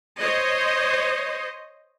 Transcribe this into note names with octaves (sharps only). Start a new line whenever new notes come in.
C5 C#5 D#5